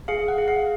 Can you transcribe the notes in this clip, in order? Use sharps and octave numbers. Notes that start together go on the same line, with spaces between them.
G#4 F5
F#5
G#4
F5